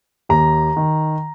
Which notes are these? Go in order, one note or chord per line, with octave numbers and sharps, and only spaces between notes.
D#2 A#5
D#3